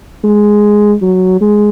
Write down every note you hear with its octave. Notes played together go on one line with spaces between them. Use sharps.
G#3
F#3
G#3